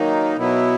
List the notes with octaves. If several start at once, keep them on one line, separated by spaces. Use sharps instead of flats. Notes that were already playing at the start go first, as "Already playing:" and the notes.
Already playing: D#3 F#3 A#3 D#4
B2 F#3 B3 E4